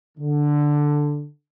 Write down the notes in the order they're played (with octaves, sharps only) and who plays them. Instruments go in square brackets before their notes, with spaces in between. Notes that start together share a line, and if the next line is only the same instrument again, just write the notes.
[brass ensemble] D3